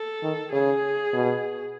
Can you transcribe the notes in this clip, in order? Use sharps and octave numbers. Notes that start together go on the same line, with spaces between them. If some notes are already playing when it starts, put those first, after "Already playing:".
Already playing: A4
D#3
C#3 G#4
B2